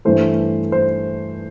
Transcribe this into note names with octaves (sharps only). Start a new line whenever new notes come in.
G2 E3 A3 C5
C5